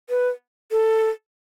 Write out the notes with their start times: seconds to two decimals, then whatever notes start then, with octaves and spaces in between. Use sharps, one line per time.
0.10 B4
0.71 A4